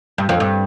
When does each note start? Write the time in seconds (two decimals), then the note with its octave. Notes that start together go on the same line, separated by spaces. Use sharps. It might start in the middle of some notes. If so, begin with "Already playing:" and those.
0.18 G2
0.29 F2
0.40 G2